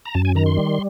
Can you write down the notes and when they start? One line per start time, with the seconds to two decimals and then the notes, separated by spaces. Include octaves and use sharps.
0.05 A#5
0.15 F#2 A5
0.25 G#5
0.35 D#3 A#5
0.46 C6
0.57 G3